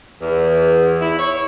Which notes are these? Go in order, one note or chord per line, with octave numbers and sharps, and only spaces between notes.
E2
E4
C#5